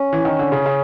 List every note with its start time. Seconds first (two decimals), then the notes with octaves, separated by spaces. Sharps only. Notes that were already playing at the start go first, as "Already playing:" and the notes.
Already playing: C#4
0.13 E3
0.25 D#3
0.39 D3
0.52 C#3
0.66 C#3